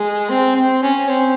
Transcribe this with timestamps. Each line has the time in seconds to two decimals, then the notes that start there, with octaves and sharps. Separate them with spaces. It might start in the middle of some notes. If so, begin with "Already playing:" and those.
Already playing: G#3
0.30 C4
0.56 C4
0.83 C#4
1.09 C4